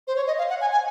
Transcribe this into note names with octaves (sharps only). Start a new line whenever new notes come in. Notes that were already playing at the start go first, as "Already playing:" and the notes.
C5
C#5
D#5
F5
F#5
G#5
G#5